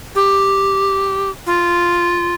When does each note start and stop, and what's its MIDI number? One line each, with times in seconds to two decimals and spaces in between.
0.15 1.30 67
1.46 2.35 65